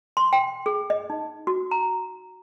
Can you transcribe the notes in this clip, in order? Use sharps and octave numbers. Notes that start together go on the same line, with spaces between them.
C6
G5
G#4
D#5
D#4
F#4
A#5